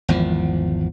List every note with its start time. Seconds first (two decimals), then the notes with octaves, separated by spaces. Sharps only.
0.09 G#1 E2 F3